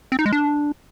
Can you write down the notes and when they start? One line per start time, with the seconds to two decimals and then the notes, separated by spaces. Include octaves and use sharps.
0.12 C4
0.19 D#4
0.26 G#3
0.32 D4